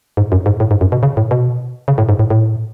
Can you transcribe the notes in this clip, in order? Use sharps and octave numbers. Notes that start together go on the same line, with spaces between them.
G#2
F#2
G#2
A2
G#2
F#2
B2
C#3
A2
B2
C#3
A2
G#2
A2
A2